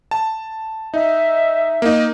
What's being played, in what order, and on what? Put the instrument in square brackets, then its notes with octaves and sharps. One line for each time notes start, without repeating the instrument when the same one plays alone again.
[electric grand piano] A5
[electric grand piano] D#4 [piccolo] E5
[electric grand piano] A#3 D#4